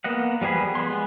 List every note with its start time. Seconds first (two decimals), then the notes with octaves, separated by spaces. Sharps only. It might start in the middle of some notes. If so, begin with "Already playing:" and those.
0.04 A#3 B3 D#5 F#5
0.41 F3 G3 B3 G#4 B5
0.75 G#3 B3 C6